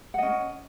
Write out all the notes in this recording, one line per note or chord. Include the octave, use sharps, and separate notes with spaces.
C#4 D#5 F#5